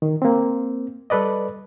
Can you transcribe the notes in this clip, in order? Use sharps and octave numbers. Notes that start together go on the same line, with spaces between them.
D#3
A#3 C4
G3 A4 B4 D5 D#5